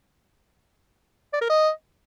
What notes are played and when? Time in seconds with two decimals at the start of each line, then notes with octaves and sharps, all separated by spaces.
1.33 D5
1.41 A#4
1.50 D#5